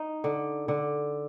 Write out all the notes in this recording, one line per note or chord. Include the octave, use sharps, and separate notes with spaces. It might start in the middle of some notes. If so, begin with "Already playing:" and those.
Already playing: D#4
D3
D3